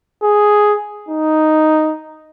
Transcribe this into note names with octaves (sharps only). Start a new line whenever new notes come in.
G#4
D#4